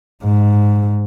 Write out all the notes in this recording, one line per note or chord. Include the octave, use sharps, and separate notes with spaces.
G#2